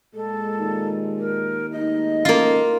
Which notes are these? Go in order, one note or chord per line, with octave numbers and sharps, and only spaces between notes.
A#2 G#3 A4
D#2
A#4
G#3 A3 D#4 D#5
A1 A#3 F4